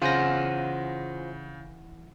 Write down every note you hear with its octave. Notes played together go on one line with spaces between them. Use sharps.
C#3 E3 F4 C5 F#5 G#5 A#6